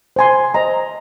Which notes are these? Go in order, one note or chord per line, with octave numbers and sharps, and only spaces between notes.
C5 G#5 C6
C5 D#5 A#5